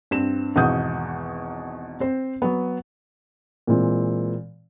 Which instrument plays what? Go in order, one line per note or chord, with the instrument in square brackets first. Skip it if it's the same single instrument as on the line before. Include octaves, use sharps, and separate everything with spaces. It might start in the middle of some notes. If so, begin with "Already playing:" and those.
[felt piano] G2 C4 E7
G#1 E2 B2 F#5 D#6 G6
C4 C5
F#3 B3
[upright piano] A#2 E3 G#3 C4